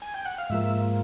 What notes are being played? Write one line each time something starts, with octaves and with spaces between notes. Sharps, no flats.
G#5
G5
F#5
F5
G#2 F3 A#3 E5